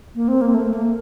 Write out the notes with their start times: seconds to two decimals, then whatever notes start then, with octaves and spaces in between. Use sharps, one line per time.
0.15 A#3
0.28 C4
0.41 A#3
0.54 A3
0.74 A#3